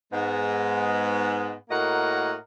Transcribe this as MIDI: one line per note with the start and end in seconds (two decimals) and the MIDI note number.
0.12 1.53 44
0.12 1.53 56
0.12 1.53 59
1.70 2.34 45
1.70 2.34 58
1.70 2.34 66
1.70 2.34 70
1.70 2.34 75
1.70 2.34 78